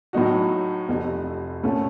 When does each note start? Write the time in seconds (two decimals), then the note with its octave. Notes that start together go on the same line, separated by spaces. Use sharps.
0.13 A2 F#3 A3 D#4 F#4
0.88 F1 F2 C3
1.63 C2 A#2 A3 C#4 A4